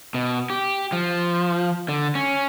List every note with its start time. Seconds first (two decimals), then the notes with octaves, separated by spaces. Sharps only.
0.14 B2
0.50 G4
0.92 F3
1.88 D3
2.15 C#4